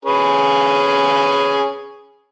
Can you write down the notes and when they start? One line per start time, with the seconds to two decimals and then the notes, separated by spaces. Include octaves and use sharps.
0.05 C#4 G#4 B4